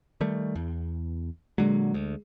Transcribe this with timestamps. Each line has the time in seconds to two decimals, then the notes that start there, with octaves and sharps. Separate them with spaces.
0.21 D#3 G3 A3
0.55 E2
1.58 A#2 D3 F#3 G#3
1.94 D2